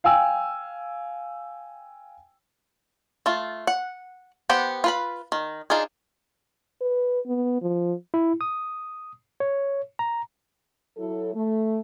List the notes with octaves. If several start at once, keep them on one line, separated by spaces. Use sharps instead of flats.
F5 G5 G#5 E6
A3 F4
F#5
B3 G4 C5 F#5 G5
F4 B4 B5
D#3
D4 D#4 F4 G#4
B4
B3
F3
E4
D#6
C#5
A#5
F#3 E4 A4
A3